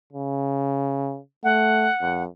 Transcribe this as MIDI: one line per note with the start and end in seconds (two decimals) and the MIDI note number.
0.13 1.19 49
1.44 1.89 57
1.44 2.22 78
2.02 2.27 41